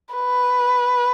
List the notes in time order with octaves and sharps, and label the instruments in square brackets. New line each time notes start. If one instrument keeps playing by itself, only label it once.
[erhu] B4